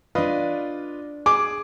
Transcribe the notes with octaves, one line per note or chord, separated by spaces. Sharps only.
D4 F4 B4 D5 D#5
G#4 D6